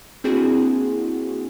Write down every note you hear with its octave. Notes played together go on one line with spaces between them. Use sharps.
A#3 C4 D4 E4 F#4 G#4